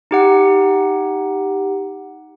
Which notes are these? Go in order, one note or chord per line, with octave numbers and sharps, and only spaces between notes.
D#4 G4 F#5